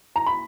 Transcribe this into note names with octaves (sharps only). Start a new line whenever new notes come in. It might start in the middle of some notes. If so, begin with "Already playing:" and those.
A#5
B5